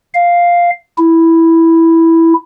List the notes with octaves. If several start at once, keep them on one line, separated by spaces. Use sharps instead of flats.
F5
E4